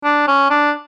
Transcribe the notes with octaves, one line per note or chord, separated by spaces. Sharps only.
D4
C#4
D4